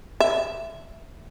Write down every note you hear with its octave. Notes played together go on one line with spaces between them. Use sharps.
E5